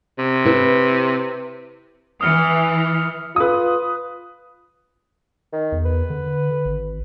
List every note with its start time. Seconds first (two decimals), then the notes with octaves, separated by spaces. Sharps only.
0.19 C3
0.45 E4 B4
2.21 E3 D#6 F6 C#7
3.36 F4 B4 D#6
5.53 D#3
5.72 E2
5.85 B4
6.10 D3
6.65 G#1